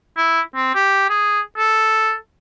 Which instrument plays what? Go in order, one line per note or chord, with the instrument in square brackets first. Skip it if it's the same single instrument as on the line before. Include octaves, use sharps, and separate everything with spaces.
[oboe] E4
C4
G4
G#4
A4